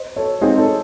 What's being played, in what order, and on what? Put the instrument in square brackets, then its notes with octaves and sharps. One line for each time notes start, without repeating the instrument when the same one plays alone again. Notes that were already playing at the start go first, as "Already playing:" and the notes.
Already playing: [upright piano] C5 D#5
A4 C#5
[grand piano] G#3 C4 D#4 [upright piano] G#4 C5
[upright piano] A4 C#5